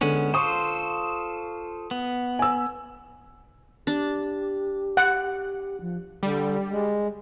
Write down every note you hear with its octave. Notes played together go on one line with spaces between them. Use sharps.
D3 G#3 B3 C#4
F4 A4 C5 C#6 D#6
B3
G#5 E6
D4 G4
F#5
F3
D3 G3
G#3